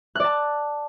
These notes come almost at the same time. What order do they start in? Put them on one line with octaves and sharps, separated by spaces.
F#6 D5 A5